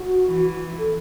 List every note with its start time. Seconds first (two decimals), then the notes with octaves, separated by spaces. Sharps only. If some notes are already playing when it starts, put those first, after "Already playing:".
Already playing: F#4
0.26 E3
0.78 A4